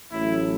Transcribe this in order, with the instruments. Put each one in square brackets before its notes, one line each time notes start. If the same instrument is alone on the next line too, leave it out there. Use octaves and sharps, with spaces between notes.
[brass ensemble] A1 A2 F#3 E4